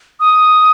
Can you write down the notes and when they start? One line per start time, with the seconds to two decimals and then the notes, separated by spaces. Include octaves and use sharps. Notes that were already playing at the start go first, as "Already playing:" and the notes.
0.20 D#6